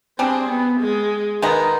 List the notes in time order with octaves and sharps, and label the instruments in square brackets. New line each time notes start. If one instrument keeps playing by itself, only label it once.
[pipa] G3 D4 G#4 [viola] C4
[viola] B3
G#3
[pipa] B2 G#3 B3 D#4 [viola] D#3